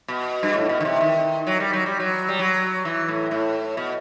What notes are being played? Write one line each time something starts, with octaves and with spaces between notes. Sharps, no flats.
B2
G2
A2
B2
D#3
C3
D#3
F#3
G3
F#3
G3
F#3
G3
F#3
E3
A2
A2
B2